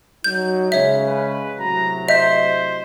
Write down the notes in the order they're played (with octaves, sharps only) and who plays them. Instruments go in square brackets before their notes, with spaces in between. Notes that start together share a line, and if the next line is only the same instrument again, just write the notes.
[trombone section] F#3 D#4 [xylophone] G6
[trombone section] C#3 G#3 [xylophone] C#5 E5
[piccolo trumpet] B4
[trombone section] A2 C3 F#3 [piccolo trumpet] A#5
[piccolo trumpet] C5 [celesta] D#5 G6 B6 [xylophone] E5